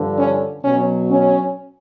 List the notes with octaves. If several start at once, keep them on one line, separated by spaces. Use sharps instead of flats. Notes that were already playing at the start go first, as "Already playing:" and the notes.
Already playing: G2 D3 F3
C#4
B2 F#3 C#4
C#4